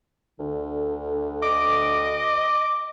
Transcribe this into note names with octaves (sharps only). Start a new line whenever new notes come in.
D2 D3
D#5 D6